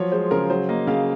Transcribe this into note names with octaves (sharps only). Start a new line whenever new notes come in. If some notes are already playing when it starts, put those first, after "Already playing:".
Already playing: F3 F#3 C#5
G#3 C5
C#3 A#4
F#3 C5
A#3 D#5
C#3 F5